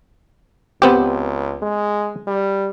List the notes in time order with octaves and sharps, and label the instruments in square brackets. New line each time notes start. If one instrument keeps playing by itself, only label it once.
[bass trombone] C#2 [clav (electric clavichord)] B3 C4 G4
[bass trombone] G#3
G3